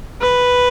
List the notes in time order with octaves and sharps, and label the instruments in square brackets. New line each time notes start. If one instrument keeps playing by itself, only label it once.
[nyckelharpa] B4